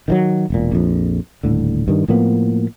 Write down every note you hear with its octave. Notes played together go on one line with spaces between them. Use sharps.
D#3 E3 F#3
E1 A#2
A#1 F2
D#1 A2 D3
G2 D#3
A2 F3 A#3 B3